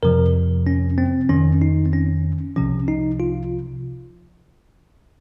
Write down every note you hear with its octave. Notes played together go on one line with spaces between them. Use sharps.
F2 C3 F3 A#4
C#4
C4
F2 D#3 C#4
D#4
C4
C#4
C2 C3 F3 C#4
D#4
F4